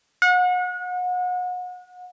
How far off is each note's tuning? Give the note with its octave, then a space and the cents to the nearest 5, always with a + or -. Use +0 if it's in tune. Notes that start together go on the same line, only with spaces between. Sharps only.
F#5 -35